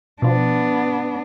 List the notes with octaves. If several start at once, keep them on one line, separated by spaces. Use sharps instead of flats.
B2 F3 B3 D4